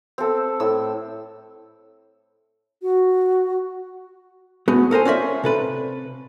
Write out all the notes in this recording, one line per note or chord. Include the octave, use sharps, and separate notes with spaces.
C4 A4
A2 E6
F#4
A3 B3 F#4 G#4
A4 A#4 C5 G#5
C#4 F4 D5 E5
C3 A4 B4